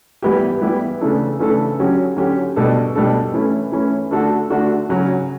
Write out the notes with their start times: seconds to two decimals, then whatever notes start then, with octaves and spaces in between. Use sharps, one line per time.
0.22 E3 G3 B3 E4 G4
0.62 E3 G3 B3 E4 G4
1.01 C#3 E3 A3 D4 A4
1.39 C#3 E3 A3 D4 A4
1.78 D3 F#3 C#4 G4
2.17 D3 F#3 C#4 G4
2.56 B2 G3 D4 A4
2.95 B2 G3 D4 A4
3.34 E3 A3 C#4 E4
3.72 E3 A3 C#4 E4
4.11 D3 A3 D4 F#4 A4
4.50 D3 A3 D4 F#4 A4
4.89 C#3 F#3 C#4